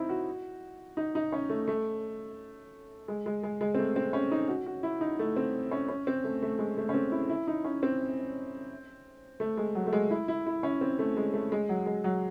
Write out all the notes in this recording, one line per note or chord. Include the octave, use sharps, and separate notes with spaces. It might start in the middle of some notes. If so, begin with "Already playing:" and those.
Already playing: C4 D#4 E4
F#4
D#4
D#4
C#4
A3
A3
G#3
G#3
G#3
G#3
C4
A3
C4
C#4
D#4
F#4
F#4
E4
D#4
A3
C4
C#4
C#4
C4
A3
A3
G#3
A3
C#4
C4
E4
E4
D#4
C#4
C4
A3
G#3
F#3
A3
G#3
E4
E4
E4
C#4
C4
A3
G#3
A3
G#3
F#3
G#3
F#3